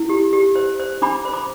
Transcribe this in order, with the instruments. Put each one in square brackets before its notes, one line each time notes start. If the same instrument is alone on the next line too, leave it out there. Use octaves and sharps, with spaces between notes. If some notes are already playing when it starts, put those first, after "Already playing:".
Already playing: [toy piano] E4
G4
G4
C5
C5
D4 B5 D6
C5
B5 D6